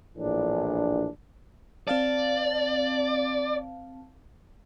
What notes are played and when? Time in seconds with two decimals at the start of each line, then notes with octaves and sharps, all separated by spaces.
0.16 A#1 A2 E3 D4
1.88 C4 D5 F5 A5